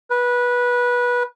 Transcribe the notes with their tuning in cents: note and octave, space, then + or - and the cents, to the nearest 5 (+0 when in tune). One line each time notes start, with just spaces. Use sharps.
B4 -20